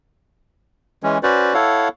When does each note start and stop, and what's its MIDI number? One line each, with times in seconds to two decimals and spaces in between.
1.03 1.18 52
1.03 1.18 56
1.03 1.18 61
1.23 1.54 61
1.23 1.54 66
1.23 1.54 71
1.23 1.54 72
1.23 1.54 74
1.54 1.89 64
1.54 1.89 69
1.54 1.89 73
1.54 1.89 77
1.54 1.89 78